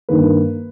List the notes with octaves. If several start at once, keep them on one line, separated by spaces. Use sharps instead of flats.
G2 D#3 A#3 B4